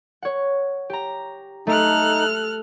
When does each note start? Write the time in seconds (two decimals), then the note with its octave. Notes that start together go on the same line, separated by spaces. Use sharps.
0.22 C#5 F#5
0.90 G4 A#5
1.67 A3 D#4 A4 F6 F#6